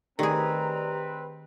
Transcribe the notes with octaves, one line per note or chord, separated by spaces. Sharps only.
D#3 A3 C4 G4 G#4 B4 D5 A#5